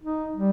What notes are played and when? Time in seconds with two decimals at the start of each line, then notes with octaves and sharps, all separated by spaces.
0.03 D#4
0.36 G3